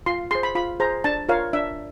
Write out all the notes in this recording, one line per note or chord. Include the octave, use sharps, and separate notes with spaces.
F4 C6
G#4 C5 C6
B5
F4 B5
G#4 C5 A#5
D4 A5
F4 A#4 C#5 F5
D4 E5